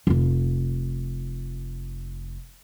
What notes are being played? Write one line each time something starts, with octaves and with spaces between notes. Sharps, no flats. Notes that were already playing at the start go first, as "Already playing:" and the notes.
F1 F4